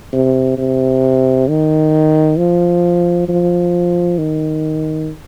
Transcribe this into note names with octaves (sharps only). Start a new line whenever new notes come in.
C3
C3
D#3
F3
F3
D#3